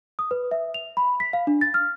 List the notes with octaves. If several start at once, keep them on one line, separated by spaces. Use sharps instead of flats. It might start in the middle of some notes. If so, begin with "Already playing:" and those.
D#6
B4
E5
F7
B5
B6
F5
D4
A6
F6